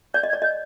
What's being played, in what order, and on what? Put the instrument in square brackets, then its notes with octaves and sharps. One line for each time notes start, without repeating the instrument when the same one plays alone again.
[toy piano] D5 [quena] G6
[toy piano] D#5
[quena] G#6
[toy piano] D5
[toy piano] D#5 [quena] G6